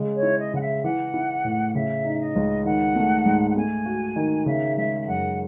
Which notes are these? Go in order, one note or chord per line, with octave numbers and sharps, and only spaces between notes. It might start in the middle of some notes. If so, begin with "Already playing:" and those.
Already playing: C#3 G#3
C#5
E4
D#5
C#3 F#5
E5
E3 F#5
E4
A2
C#3 E5
D#4
D#5
C#2
D#3 F#5
A3
G#2
F#5
A3 G#5
F#4
D#3
C#3 E5
G#3 E5
E5
F#2 F#5